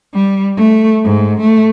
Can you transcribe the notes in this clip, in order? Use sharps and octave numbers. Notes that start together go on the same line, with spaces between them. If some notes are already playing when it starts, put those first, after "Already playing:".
G3
A3
G#2
A3